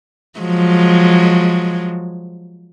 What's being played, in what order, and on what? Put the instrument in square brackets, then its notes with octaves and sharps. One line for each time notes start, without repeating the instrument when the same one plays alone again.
[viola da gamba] F3 F#3 G#3